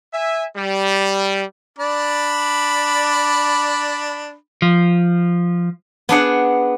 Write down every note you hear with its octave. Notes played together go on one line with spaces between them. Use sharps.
E5 G#5
G3
D4 D5 B5
F3
B3 D4 G#4 F#5